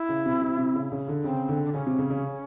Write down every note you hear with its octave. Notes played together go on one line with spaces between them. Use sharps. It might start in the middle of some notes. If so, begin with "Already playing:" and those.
Already playing: E4
C#3
C3
C3
C3
C#3
C#3
D3
C#3 C4
D3
D4
C#3 C#4
C3
C#3
C#3